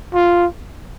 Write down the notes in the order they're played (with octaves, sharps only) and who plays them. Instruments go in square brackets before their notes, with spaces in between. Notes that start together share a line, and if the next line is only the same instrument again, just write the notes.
[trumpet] F4